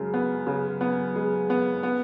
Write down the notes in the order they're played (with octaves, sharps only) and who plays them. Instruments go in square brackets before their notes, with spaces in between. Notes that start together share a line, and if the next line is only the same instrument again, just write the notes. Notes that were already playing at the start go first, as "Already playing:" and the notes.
Already playing: [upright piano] F#2 C#3 G#3
B3
C#3
B3
G#3
B3
B3